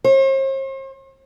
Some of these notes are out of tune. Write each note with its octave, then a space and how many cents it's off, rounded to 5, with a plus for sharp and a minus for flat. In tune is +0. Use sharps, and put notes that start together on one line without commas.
C5 +45